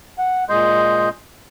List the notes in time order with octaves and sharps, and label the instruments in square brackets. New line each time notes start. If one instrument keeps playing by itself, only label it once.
[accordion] F#5
A#2 G#3 D#5 C6 G6